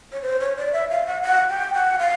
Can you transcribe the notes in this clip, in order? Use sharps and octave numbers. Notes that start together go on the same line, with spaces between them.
C#5
C5
C#5
D5
E5
F5
F#5
F#5
G5
F#5
F5